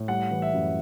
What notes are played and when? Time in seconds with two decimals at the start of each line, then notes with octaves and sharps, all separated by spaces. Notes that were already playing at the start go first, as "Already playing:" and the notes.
Already playing: A2
0.08 G3 F#5
0.31 E3
0.42 E5
0.53 F#2